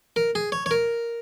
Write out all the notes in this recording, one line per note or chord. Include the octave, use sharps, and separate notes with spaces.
A#4
G#4
C#5
C#5
A#4